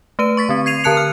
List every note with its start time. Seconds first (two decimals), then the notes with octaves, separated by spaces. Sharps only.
0.19 A3 B4 D#7
0.37 C#6 A6 B6
0.49 D3 C4
0.66 G#6 C7 D#7 F7
0.84 D3 A#4 A5 F#6 C#7 F7
0.97 F6